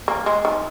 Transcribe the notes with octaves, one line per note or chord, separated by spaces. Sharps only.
A#3
G#3
D#3